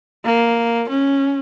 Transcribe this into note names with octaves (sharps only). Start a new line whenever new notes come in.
A#3
C#4